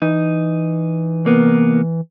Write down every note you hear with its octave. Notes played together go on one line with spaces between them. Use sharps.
E3 D#4
C2 A#3 B3